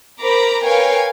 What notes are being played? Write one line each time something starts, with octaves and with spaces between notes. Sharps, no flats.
A#4 C5 A#5 B5 D6
A#4 B4 C#5 F5 G5 G#5